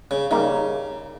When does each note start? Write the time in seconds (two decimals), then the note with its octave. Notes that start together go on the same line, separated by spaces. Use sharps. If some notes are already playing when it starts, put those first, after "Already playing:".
0.11 C#3
0.31 C#3 G3 A#3 D#4